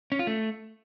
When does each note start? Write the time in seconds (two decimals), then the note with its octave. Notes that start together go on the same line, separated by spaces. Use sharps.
0.12 C#4
0.19 F4
0.27 A3